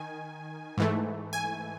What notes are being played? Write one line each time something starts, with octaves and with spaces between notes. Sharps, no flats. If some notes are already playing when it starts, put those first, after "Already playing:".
Already playing: D#3 G#5
G#2 E3 A3
G#5